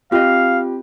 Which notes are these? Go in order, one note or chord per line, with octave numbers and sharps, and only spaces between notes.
C4 F4 G4 D#5 F5